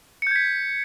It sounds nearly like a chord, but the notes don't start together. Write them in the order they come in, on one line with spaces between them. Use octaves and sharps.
C#7 G6 G#6 B6